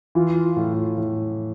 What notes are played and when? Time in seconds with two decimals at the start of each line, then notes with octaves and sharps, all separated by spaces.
0.15 E3 F4
0.56 A2
0.98 A2